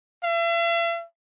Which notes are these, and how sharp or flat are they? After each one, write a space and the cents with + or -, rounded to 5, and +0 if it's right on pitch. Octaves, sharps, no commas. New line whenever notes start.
E5 +45